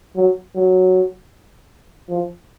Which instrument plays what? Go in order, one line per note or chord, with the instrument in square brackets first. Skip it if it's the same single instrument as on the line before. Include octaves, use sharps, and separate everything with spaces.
[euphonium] F#3
F#3
F3